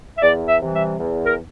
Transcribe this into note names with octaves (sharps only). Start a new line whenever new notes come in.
E5
E2 D5
E5
C3 E3 G3
E5
E2
A#4